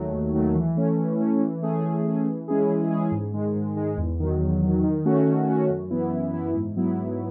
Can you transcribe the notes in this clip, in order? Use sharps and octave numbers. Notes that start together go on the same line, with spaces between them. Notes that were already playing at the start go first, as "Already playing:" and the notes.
Already playing: D#2 D#3 F#3 A3
D#2
D#3 F#3 A3
E3
A3 C#4
E3
A3 C#4
E3
A3 C#4 G#4
E3
A3 C#4 G#4
E3
G#3 C#4 E4 G#4
E3
G#3 C#4 E4 G#4
G#2
D#3 G#3
G#2
D#3 G#3
E2
D#3 F#3
E2
D#3 F#3
D#3
A3 C#4 F#4
D#3
A3 C#4 F#4
F#2
E3 B3 E4
F#2
E3 B3 E4
G#2
F#3 B3 E4
G#2